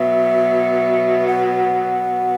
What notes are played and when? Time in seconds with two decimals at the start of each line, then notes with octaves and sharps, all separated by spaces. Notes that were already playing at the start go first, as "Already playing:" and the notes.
Already playing: B2 F#3 B3 E5
1.27 F#5